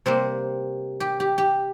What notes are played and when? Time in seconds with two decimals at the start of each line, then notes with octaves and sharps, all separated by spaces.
0.06 C3 G3 A#3 C5
1.00 G4
1.20 G4
1.38 G4